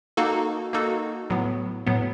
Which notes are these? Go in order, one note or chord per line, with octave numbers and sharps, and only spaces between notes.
A#3 D#4 F#4 A4
A#3 D#4 F#4 A4
A2 F#3 B3
A2 F#3 B3